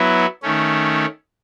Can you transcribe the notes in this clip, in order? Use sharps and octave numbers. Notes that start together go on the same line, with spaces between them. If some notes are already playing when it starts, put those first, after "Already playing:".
Already playing: F#3 B3 E4
D#3 A3 C#4